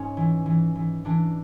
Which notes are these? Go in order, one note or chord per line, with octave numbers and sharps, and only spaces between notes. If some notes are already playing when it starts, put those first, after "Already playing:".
Already playing: G#2 C#4
E3
E3
E3
E3 D4